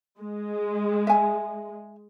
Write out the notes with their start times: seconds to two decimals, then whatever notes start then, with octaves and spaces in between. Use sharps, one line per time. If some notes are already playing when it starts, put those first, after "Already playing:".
0.19 G#3
1.07 E5 G#5